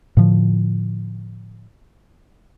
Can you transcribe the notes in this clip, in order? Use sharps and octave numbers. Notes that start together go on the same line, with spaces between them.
A2 D3 F3